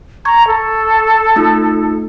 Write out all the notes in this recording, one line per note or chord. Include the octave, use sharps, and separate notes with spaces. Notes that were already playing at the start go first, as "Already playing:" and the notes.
A#5 C#6 G#6
A4
A3 D#4 F4